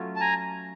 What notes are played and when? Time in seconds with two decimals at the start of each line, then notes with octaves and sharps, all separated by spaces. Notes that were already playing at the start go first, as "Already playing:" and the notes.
Already playing: F#3 A3 C#4 F4
0.16 A5
0.20 G#5 A#5